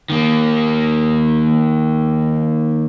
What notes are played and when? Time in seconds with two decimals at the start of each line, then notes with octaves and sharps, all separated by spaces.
0.10 D#3 A#3